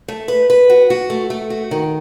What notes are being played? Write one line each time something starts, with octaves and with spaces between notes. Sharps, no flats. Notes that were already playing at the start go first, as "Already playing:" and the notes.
A3
B4
B4
F#4
F#4
A3
A3
F#4
D#3